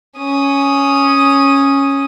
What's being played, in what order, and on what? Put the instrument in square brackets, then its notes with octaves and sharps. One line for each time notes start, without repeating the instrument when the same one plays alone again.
[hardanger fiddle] C#4 D#6